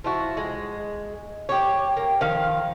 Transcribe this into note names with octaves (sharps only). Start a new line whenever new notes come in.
F3 E4 F#4
G#3
G4 C#5
A#3
D#3 F3 F5